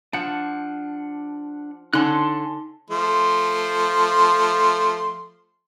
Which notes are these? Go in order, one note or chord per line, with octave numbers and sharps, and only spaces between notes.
F3 D4 F#5
D3 C#4 D#4 A5 C6 F#6
F3 A3 C6